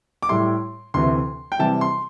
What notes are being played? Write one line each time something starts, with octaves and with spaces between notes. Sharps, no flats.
D6
A2 G3 E4 C6
D2 C3 E3 C6
G5
C3 E3 G3 A5
C6